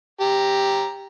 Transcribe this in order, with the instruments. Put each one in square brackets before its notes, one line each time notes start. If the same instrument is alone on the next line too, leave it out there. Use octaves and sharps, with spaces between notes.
[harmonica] G4 A#5